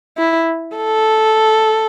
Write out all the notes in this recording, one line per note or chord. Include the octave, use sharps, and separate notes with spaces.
E4
A4